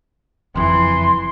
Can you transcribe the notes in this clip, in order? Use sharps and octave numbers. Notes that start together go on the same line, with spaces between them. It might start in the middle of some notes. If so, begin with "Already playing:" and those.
F#1 F2 E3 C6